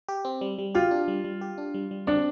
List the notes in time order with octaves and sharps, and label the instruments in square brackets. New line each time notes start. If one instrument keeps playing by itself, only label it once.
[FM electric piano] G4
C4
G3
G3
[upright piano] F4 [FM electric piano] G4
[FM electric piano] D4
G3
G3
G4
D4
G3
G3
[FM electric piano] C4 [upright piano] D4